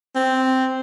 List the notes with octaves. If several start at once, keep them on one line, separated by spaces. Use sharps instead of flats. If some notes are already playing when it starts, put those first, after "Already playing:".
C4